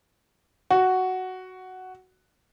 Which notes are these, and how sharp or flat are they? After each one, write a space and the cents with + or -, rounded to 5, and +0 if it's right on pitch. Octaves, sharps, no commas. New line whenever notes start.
F#4 +5